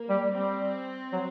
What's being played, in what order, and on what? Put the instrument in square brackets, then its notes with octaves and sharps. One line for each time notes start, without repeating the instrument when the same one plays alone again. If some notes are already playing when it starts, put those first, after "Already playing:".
Already playing: [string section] A#3
[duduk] G3
[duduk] G3 [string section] C4
[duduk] F#3